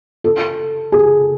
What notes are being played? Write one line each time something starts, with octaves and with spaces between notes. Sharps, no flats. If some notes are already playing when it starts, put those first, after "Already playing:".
A4
G#4